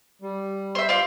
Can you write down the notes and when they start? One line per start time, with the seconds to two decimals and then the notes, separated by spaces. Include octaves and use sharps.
0.22 G3
0.75 C5 E5
0.89 F4 C5 D5